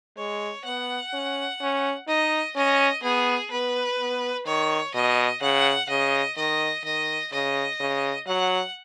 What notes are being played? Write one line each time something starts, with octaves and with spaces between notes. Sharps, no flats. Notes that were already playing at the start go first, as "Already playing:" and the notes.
G#3 C#5
B3 F#5
C#4
C#4
D#4 D#5
C#4 D#5
B3 G#4
B3 B4
B3
D#3 C#5
B2 D#5
C#3 F#5
C#3 D#5
D#3 D#5
D#3 D#5
C#3 D#5
C#3
F#3 F#5